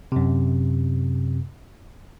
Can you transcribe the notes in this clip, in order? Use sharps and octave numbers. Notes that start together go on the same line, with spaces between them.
F#2 C3